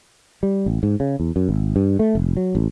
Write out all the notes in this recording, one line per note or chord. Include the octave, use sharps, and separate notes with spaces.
G3
A1
G#2
C#3
E2
F#2
G#1
G2
A3
F1
F#3
A1